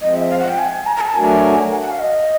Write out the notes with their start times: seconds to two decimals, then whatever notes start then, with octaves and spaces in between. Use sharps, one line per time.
0.01 F3 G#3 C4 D#5
0.16 E5
0.29 F5
0.39 F#5
0.49 G5
0.58 G#5
0.86 A#5
0.96 A#5
1.01 G#5
1.06 A5
1.15 F#3 A3 D4 F#4 A#4 G#5
1.71 F#5
1.81 F#5
1.91 F5
1.99 D#5